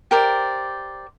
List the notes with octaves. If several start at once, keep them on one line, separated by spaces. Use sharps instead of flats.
G4 A#4 C5 D5